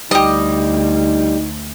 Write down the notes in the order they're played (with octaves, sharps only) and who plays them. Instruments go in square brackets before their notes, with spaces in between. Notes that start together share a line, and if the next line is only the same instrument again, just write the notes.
[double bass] D2 [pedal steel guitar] G3 [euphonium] D#4 [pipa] G4 D#5